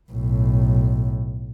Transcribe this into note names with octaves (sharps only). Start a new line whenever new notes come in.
B1 A2